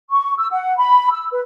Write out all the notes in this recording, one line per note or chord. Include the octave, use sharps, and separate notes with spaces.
C#6
E6
F#5
B5
E6
B4